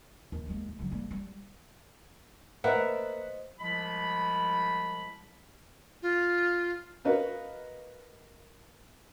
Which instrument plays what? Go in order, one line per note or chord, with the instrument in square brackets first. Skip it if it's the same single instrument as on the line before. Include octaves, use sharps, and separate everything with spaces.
[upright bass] D#2
G#3 A#3
D#2
D3 F#3
G3 A#3
G3
[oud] A#3 [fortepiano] B4 E5 F#5 [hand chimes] C5 D#5
[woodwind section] C2 F3 G#3 B5
[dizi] F4
[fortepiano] F#4 A#4 B4 D#5 F5